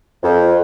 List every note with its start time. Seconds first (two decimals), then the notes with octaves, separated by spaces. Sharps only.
0.23 F2